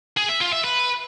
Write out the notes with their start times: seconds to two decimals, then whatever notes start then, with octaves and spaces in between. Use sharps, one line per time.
0.17 G#4
0.28 E5
0.40 F4
0.52 E5
0.64 B4